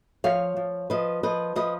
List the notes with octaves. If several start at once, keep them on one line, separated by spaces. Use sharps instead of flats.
F3 C#5 F5
F3
F3 B4 D#5
F3 B4 D#5
F3 B4 D#5